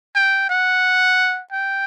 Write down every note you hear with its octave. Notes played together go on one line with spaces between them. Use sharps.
G5
F#5
G5